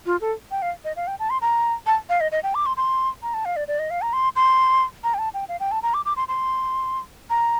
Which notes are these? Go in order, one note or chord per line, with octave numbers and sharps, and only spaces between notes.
F4
A4
G5
F5
D#5
F5
G5
A5
C6
A#5
A5
F5
D#5
D#5
G5
D6
C6
C6
A#5
A5
F5
D5
D5
D#5
F5
A#5
C6
C6
A#5
G5
A5
G5
F5
G5
A5
A#5
D6
D6
C6
C6
A#5